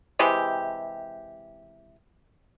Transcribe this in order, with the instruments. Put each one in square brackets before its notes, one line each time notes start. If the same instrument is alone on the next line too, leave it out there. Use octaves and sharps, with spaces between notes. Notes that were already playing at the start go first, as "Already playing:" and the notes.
[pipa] C3 E3 G#3 G4